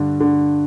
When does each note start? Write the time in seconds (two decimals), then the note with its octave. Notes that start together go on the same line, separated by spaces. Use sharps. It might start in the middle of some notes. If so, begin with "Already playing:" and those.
Already playing: G2 D3
0.20 D3